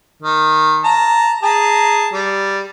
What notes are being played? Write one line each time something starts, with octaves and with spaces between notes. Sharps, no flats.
D#3
A5 A#5
G#4 A5 A#5
G3